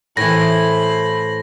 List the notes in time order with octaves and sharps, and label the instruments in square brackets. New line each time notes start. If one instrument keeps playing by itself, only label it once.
[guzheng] A2 E3 [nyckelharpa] C5 B5 [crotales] A#6